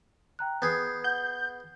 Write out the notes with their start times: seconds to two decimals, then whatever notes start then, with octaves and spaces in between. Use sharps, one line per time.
0.39 G5 A#5 F#6
0.62 B3 G#4 G6 G#6 C7
1.04 F#5 G6